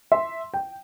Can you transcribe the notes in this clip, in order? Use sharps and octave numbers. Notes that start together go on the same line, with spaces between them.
E5 C6
G5